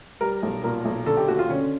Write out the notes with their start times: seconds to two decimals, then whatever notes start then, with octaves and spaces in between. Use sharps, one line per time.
0.21 G3 A#4
0.43 B1
0.64 A#2 A#4
0.85 B1
1.06 D3 A4
1.17 G4
1.28 D#2 F#4
1.39 F4
1.49 D3 C#4